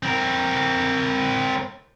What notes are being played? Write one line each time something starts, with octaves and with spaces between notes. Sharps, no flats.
C4 A#4